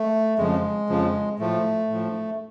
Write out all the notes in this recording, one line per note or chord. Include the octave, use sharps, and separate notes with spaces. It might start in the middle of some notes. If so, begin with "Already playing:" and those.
Already playing: A3
F2 C#3 F3 G#3
F2 C#3 F3
A2 F3 A3
A2 F3